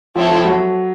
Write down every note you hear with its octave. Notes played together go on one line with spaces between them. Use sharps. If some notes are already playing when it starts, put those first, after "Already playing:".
F3 C4 E4 A4 C#5
F3
F#3